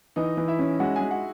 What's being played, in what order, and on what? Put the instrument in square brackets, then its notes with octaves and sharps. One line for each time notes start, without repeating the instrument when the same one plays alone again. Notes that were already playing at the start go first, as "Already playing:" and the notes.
[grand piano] E3 [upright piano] D#4 D#5
[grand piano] E3
[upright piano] E4 E5
[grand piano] C#4
[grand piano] G#3 [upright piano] F#4 F#5
[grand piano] G#3 [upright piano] G#4 G#5
[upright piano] F#4 F#5